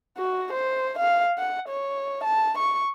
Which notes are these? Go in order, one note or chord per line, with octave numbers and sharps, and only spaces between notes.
F#4
C5
F5
F#5
C#5
A5
C#6